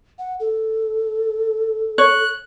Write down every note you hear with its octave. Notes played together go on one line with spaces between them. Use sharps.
F#5
A4
C#5 F#6